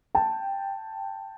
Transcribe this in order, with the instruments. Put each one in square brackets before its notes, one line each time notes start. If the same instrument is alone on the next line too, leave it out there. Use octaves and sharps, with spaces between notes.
[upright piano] G5 A5